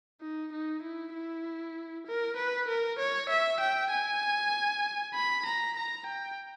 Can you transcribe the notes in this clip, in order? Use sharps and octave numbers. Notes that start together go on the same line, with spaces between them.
D#4
D#4
E4
E4
A#4
B4
A#4
C#5
E5
G5
G#5
B5
A#5
A#5
G5